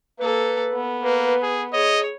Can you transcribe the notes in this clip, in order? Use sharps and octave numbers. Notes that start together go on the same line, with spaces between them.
A#3 A4 B4
B3
A#3 B4
G#4
G#4 C#5 D#5